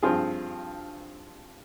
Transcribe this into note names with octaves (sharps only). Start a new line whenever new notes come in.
G2 F3 C4 F4 G#4